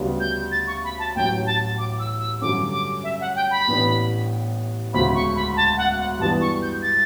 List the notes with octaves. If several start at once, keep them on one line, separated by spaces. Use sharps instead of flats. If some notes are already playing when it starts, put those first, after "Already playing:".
Already playing: D2 C#3 G3 B3 D4
G6
A6
C#6
B5
A5
A1 A2 F#3 G5
A5
D6
E6
E6
G2 D3 F#3 A3 C#4 D6
D6
E5
F#5
G5
B5
A1 A2 E3 B3 D4
E1 D2 C#3 B5
C#6
B5
A5
F#5
F#5
G2 E3 G3 B3 D4 A5
C#6
G6
A6